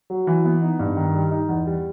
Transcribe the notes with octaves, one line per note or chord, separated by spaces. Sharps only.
F#3
E3
B3
D#4
G2
D#3
G3
D#4
E2
G3